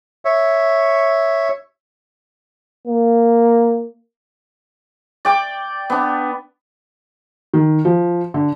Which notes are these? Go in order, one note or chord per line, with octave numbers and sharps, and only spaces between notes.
C#5 E5
A#3
D5 G5 D6
B3 D4
D#3
F3
D3